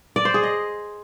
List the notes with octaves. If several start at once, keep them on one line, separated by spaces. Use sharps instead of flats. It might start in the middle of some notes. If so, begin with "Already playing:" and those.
D5
C5
G#4
D#5